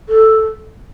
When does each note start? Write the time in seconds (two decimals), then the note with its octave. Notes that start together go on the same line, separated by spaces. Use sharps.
0.09 A4